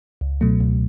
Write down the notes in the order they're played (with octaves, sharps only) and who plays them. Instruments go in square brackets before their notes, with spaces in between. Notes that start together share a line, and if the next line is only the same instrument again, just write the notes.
[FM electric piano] C#2
B2 F#3 A3
C#2